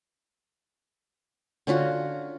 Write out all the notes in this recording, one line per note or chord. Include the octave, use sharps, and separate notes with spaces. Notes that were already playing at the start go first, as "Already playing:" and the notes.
D3 C#4 F4 F#4